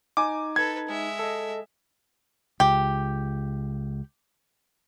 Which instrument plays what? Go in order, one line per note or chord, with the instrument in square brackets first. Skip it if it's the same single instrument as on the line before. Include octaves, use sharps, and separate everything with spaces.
[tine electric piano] D#4 [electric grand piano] G#5 D6
[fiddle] A4 B4 [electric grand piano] G#6
[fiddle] G#3 E5
[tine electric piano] A4 D#5
[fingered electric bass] C#2 [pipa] G4